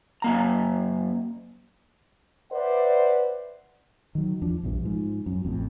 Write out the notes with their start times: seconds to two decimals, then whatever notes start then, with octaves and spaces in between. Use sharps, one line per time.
0.22 F#2 A#3 A#5
2.52 B4 C5 D5 E5 F#5
4.15 D#3 F#3
4.42 E2 F3 D4
4.63 A#1 E2 G2
4.84 G#2 F3
5.26 F#2
5.45 A1 F2